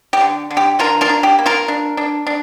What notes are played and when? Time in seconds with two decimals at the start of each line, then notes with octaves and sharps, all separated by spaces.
0.13 G4
0.21 D3
0.51 D3
0.57 G4
0.79 D3 F4 A#4
1.01 F4 A#4
1.09 D4
1.23 G4
1.39 A#3
1.46 F4 A#4
1.68 D4
1.97 D4
2.27 D4